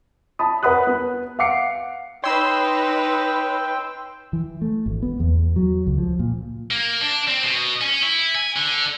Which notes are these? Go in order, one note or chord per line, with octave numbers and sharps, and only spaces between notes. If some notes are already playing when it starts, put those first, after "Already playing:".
A5 B5 D#6
A#4 B4 F#5 B5 D#6 F#6
B3
F5 F#5 D6 C7 C#7
D#4 B4 C#5 G5 B5 C6 E6
E3
A3
G#1
B3
E2
F#3
C#2
F3
A#2
A#3
D4
C4
B2
C#4
E4
G#5
D3